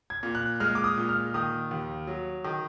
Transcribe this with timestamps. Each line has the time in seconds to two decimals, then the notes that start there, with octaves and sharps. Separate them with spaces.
0.10 G#6
0.23 A#2
0.35 F#6
0.60 G#3 F6
0.75 D6
0.84 D#6
0.98 A#2
1.09 F6
1.34 D#3 D#6
1.71 D#2
2.07 F#3
2.44 D#3